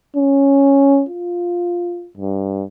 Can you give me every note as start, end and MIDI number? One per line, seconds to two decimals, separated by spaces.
0.17 1.04 61
1.09 2.09 65
2.18 2.63 43